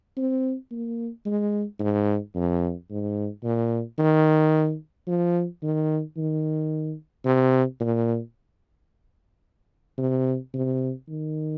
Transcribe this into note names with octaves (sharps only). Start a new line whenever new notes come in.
C4
A#3
G#3
G#2
F2
G#2
A#2
D#3
F3
D#3
D#3
C3
A#2
C3
C3
D#3